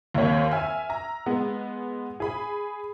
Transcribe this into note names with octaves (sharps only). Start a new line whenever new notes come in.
D#2 A#3 C4 C5 C#5 B6
E5 G#5 E6 F6
A#5
G#3 B3
G#4 B5